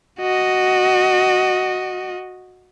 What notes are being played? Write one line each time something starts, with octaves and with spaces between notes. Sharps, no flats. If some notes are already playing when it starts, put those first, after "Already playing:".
F#4 D#5